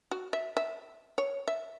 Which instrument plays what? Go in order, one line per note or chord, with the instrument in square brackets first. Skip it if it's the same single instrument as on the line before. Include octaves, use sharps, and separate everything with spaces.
[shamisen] F#4
E5
E5
C#5
E5